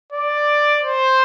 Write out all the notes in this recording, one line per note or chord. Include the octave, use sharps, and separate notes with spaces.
D5
C5